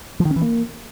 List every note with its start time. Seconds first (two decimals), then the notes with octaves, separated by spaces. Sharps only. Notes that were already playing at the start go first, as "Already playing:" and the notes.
0.20 F3
0.25 D#3
0.31 C#4
0.36 E3
0.42 A#3